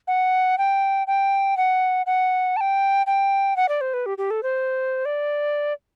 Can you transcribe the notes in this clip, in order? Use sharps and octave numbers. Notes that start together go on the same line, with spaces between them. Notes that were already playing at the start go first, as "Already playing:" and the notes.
F#5
G5
G5
F#5
F#5
A5
G5
G5
F#5
D5
C5
B4
G4
G4
A4
C5
D5